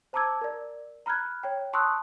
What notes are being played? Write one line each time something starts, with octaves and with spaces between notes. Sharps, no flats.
C5 A5 A#5 D6 E6 G#6
A#4 D5
A#5 B5 F6 F#6 G#6
C#5 G5
A5 C6 C#6 D#6 E6 F#6